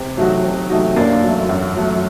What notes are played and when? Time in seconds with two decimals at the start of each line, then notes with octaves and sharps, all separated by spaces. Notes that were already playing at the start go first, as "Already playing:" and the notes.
Already playing: C3
0.17 F#3 A3 D#4 F#4
0.44 C3
0.70 F#3 A3 D#4 F#4
0.96 F#2 A#3 D4
1.23 F#3 A3
1.49 F#2
1.76 F#3 A3